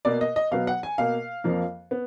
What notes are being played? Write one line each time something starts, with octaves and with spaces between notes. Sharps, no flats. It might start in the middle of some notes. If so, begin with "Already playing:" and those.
B2 A#3 D5
D#5
D#5
B2 F#3 B3 F5
F#5
G#5
B2 A#3 F5
F2 F3 A#3
B3